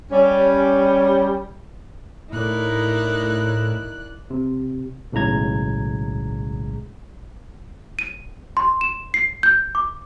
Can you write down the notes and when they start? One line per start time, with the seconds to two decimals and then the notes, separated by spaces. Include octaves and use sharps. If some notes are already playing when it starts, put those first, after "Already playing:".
0.11 G3 C#4
2.33 A2 D#4 E4 A#4 D5 F#6
4.30 C3
5.12 B1 A2 C#3 G#3 A#5 G#6
7.99 D#7
8.57 C6
8.81 E7
9.14 C7
9.43 G6
9.75 D6